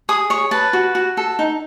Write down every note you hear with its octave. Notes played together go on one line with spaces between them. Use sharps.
G#4 D#6
C#5 C#6
B4 A5
F#4
F#4
A4
D#4